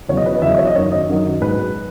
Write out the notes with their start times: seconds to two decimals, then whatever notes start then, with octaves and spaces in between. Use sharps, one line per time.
0.09 E2 C#3 F#3 C#5
0.17 D#5
0.26 B4
0.34 D#5
0.42 E2 C#3 F#3 E5
0.51 D#5
0.58 C#5
0.67 D#5
0.76 F#2 D#3 F#3 C#5
0.92 D#5
1.09 F#2 D#3 F#3
1.41 G#2 F#3 B4